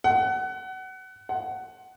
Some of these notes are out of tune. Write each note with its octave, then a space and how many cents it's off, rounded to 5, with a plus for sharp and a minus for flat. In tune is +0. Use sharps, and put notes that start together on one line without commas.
F#5 +25
F#5 +15